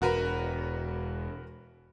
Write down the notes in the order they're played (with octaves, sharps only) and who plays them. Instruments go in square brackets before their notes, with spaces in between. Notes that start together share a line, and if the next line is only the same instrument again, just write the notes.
[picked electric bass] E1 [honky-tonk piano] F#4 A#4 B4